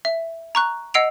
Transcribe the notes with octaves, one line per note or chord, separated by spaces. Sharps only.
E5
A#5 C#6 F#6
D#5 F#5 E6 C7 D7 F7